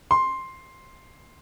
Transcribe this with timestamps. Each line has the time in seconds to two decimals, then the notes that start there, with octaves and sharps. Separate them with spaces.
0.11 C6